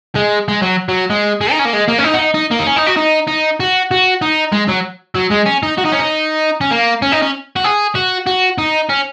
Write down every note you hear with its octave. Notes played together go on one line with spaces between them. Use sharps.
G#3
G#3
F#3
F#3
G#3
G#3
D#4
C#4
A#3
G#3
A#3
C#4
D#4
F#4
D#4
D#4
A#3
D#4
C#4
D#4
F#4
D#4
D#4
F#4
F#4
D#4
G#3
F#3
F#3
G#3
C#4
D#4
F#4
D#4
C#4
D#4
C#4
A#3
C#4
D#4
C#4
F#4
G#4
F#4
F#4
D#4
C#4